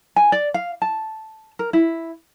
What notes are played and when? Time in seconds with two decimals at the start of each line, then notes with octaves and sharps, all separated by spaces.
0.16 G#5
0.32 D5
0.54 F5
0.82 A5
1.59 A#4
1.73 E4